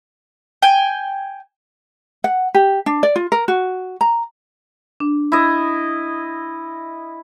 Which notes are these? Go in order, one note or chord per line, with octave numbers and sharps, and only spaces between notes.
G5 G#5
F#5
G4
D4
D5
F4
A#4
F#4
A#5
D4
E4 D#5